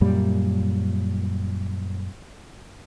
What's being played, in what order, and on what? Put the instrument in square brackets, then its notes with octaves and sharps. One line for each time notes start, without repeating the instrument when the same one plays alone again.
[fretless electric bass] F#2 A#2 G3